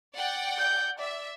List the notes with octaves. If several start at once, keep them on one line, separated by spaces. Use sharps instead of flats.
D5 F#5 G5
G6
D5 E5